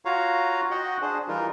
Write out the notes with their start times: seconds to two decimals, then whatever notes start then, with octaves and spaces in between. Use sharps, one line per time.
0.05 F4 F#4 C#5 F5 A#5
0.71 F#4 D#5 F#5 G5
1.02 D4 G#4 C5
1.28 E3 G3 D#4 F4 A#4